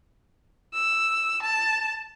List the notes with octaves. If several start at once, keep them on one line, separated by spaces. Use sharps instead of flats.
E6
A5